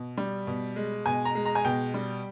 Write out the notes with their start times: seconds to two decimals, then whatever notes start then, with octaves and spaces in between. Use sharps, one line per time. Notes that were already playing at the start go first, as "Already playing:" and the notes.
Already playing: B2
0.17 G3
0.47 B2
0.76 G#3
1.06 B2 G#5
1.25 A#5
1.35 G#3
1.46 A#5
1.55 G#5
1.65 B2 G5
1.94 G3